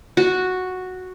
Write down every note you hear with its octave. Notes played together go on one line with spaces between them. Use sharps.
F#4